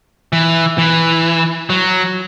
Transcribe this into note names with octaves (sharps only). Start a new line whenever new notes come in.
E3
E3
F#3